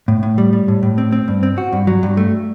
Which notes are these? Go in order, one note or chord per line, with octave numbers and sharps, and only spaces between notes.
A2
A2
G3
G3
A2
A2
C4
C4
G2
C4
F#4
G2
F#3
G2
A3